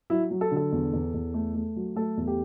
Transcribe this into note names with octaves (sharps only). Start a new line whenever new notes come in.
F#3 E4
F#3
A4
D3
A4
E2
E2
E2
A3
A3
F#3
A3 A4
E2
G4